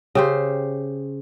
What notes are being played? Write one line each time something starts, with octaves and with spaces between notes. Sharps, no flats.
C#3 G4 C5